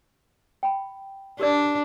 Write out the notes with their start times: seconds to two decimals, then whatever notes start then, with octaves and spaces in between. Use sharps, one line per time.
0.63 G5 B5
1.40 D4 G4 A#4 D5